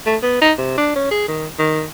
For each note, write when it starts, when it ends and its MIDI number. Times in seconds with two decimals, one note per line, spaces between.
0.06 0.17 57
0.23 0.38 59
0.41 0.53 63
0.58 0.75 48
0.78 0.93 62
0.96 1.10 61
1.11 1.27 68
1.28 1.47 51
1.59 1.84 51